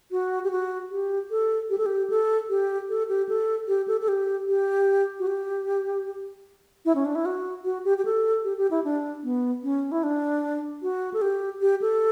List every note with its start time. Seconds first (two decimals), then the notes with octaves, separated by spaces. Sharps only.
0.11 F#4
0.44 G4
0.51 F#4
0.91 G4
1.31 A4
1.70 G4
1.78 A4
1.86 G4
2.10 A4
2.49 G4
2.89 A4
3.09 G4
3.29 A4
3.68 G4
3.88 A4
4.01 A4
4.08 G4
4.48 G4
5.20 F#4
5.27 G4
6.85 E4
6.95 C#4
7.05 D4
7.15 E4
7.26 F#4
7.65 F#4
7.85 G4
7.98 G4
8.05 A4
8.44 G4
8.58 G4
8.71 E4
8.84 D4
9.24 B3
9.63 C#4
9.92 E4
10.03 D4
10.82 F#4
11.14 A4
11.22 G4
11.61 G4
11.82 A4